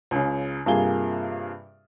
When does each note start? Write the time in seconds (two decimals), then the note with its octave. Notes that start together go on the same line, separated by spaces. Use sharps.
0.11 C#2 C#3
0.66 G2 C3 A#3 F4 G#4 G7